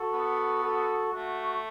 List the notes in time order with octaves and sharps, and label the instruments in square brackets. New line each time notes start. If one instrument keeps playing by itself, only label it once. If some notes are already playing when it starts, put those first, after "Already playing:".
Already playing: [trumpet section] F#4 A4
[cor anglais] B3
[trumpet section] F#4 A4
[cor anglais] A3 [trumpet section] F#4